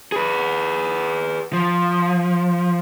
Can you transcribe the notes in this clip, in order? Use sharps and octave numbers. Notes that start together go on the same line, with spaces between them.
G#4 B4
F3